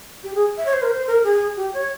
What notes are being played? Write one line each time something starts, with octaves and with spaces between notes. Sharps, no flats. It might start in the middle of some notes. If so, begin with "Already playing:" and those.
G4
G#4
E5
C#5
C5
A#4
C5
A#4
G#4
G4
C#5